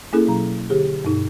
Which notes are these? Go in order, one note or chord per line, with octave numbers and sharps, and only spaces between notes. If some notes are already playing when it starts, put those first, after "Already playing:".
A#3 C#4 E4 G#4 A4
B2 F#3 A#5
D3 G4 G#4
G2 B2 D#4